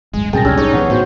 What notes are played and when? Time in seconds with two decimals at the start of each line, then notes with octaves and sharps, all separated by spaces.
0.13 D1 G1 G#3
0.33 C2 F#2 A#2 G#4 G5 A5 A6 A#6
0.45 C#2 C#4 D4 G4 E6 F6 G#6
0.58 D#4 G#4 C#5 C#6
0.73 B2 E3 B3 C#5 F#5
0.90 A2 F#4 C5